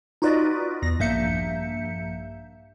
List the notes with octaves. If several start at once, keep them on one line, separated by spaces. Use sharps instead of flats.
D#4 F4 F#4 B4 D5 D#5
E2 A#6
A#1 G2 A#3 E5 G6 C#7